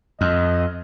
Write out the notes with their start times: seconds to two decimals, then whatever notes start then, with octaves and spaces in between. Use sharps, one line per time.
0.21 F2 D#5